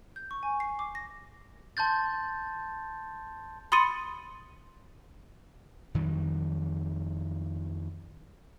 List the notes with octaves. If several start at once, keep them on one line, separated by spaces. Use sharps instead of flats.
G6
C#6
G#5
C7
D6
A#6
A5 C6 G6 A6
B5 C6 D#6 A6 C#7 D#7
F2 D#3 F#3 G3